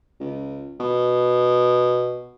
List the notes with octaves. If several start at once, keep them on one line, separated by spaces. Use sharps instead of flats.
C#2
B2